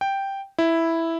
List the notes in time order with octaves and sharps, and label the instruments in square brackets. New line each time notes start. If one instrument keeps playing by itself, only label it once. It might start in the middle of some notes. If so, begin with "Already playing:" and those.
[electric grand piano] G5
E4